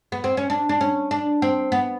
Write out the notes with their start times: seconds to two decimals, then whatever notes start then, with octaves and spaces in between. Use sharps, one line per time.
0.12 B3
0.24 C4
0.37 C#4
0.50 D4
0.69 D4
0.81 C#4
1.11 D4
1.42 C4
1.72 B3